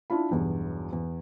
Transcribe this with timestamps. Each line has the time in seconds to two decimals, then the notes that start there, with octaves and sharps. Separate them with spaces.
0.10 D4 E4 F4 B5
0.30 B1 E2 G2
0.93 E2